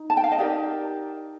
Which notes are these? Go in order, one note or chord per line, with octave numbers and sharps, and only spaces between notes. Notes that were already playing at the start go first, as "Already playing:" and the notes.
Already playing: D#4
A5
G5
F5
D#5
D#4 G4 A#4 D5